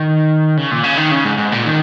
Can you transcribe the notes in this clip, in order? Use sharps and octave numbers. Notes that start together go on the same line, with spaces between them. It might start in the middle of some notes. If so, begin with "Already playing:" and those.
Already playing: D#3
C#3
A#2
C#3
D#3
C#3
G#2
G#2
A#2
D#3